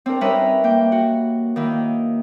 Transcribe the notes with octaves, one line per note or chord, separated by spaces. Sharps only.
C4 D4 A#4
G3 C#4 D#4 A#4 B4 E5
A#3 G5
F#4
D#3 A#3 E4